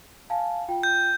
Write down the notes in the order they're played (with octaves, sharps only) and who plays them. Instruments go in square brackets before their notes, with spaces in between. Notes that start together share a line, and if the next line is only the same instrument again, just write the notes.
[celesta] F5 G#5 A5
F4 G5
[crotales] G6